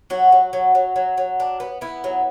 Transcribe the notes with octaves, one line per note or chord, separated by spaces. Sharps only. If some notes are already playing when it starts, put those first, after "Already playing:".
F#3 F#4
F#3
F#3
F#3
F#3
F#3
D4
B3
B3 E4
F#3